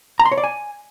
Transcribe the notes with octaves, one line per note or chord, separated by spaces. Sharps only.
A#5
C6
C#5
D5
G#5